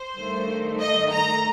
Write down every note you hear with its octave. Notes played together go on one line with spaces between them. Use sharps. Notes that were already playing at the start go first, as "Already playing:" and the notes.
Already playing: C5
G2 D#3 A3
D#5
A#5